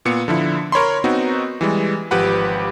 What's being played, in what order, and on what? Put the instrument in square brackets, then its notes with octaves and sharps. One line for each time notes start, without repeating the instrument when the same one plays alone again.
[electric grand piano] A#2 B3 C#7
D3 F3 E4
A#4 C#5 B5 C6
B3 C4 D#4 F#4
E3 G3 G#3
G#1 F3 G4 B4 F#5 B5